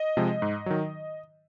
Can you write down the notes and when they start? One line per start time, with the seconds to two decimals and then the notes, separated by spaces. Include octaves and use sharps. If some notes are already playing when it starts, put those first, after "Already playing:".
Already playing: D#5
0.17 C3 F3 G#3
0.42 G#2
0.66 D#3 F#3